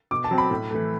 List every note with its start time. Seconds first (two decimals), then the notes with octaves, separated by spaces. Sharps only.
0.11 B2 D6
0.24 A5
0.31 F#3 C4
0.38 B5
0.51 A2
0.70 E3 A3